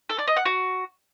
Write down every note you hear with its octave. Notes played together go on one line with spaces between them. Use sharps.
A4
D5
D#5
F#5
F#4